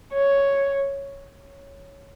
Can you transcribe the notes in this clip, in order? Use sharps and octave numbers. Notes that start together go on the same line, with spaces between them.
C#5